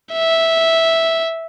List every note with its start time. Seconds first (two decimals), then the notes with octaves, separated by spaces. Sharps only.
0.13 E5